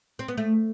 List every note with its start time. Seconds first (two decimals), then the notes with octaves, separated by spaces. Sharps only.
0.19 C4
0.28 B3
0.37 A3